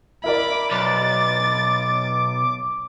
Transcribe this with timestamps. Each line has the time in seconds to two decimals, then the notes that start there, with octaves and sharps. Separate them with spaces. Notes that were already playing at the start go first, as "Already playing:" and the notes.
0.24 E4 A#4 D5 B5 D6
0.71 B1 D6 A6